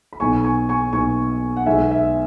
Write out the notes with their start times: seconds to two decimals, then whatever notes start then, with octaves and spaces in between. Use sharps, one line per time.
0.13 B5
0.20 B1 B2 B3 G#5 C#6
0.44 G#5 C#6
0.69 G#5 C#6
0.93 B1 B2 B3 G#5 C#6
1.57 F#5
1.66 B1 B2 G#3 B3 E5 G#5
1.91 E5